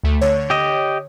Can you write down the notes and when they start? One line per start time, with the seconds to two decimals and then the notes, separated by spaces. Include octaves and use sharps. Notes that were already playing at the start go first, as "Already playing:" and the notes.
0.04 D2 A3
0.21 D3 C#5
0.50 G4 D#5